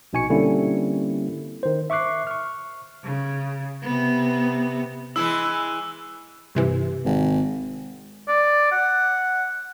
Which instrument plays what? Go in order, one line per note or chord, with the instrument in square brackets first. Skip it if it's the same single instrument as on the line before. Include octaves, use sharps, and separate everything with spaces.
[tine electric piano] A#1 B2 D#4 G#5 C#6 C#7
D3 G3 A#3 C4 C#4 E4
D#3 C5
E5 C#6 D6 F#6 C7
C#6 F6
[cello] C#3
C3 B3
[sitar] E3 G#3 E4 [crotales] E6
[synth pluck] G2 C3 E3
[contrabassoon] G#1
[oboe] D5
F#5